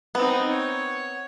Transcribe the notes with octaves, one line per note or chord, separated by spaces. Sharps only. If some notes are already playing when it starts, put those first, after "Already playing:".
B3 C4 D#4
C#5